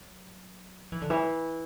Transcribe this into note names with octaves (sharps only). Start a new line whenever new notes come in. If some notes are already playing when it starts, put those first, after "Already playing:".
Already playing: F#3
E3
D3
E3